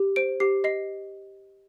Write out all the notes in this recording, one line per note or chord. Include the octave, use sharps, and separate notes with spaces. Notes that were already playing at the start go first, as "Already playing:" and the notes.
Already playing: G4
C5 D7
G4 C7
D#5 C7